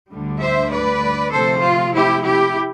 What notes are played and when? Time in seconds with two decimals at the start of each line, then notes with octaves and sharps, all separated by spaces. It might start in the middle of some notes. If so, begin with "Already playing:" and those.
0.11 D2 D3 G3
0.41 C5 E5
0.72 B4 D5
1.33 C3 F3 A3 C4 A4 C5
1.63 F4
1.95 E4 G4
2.24 E4 G4